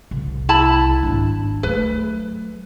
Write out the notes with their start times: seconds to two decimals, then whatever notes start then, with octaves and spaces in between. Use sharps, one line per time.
0.11 C2
0.49 E4 A5 B5
1.03 G#1 D4
1.63 F#3 A3 B4